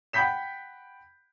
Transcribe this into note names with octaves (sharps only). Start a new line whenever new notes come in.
F#5 G5 B5 G6 B6 E7